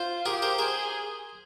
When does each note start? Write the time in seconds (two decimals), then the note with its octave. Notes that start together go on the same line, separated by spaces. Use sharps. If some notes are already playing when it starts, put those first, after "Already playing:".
Already playing: F4 C5
0.25 G4 G#4 A#4
0.42 A#4 C5
0.59 G#4 A#4 C5